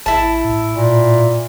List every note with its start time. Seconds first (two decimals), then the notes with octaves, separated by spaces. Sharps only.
0.06 A1 E4 A5
0.45 A2
0.75 A#2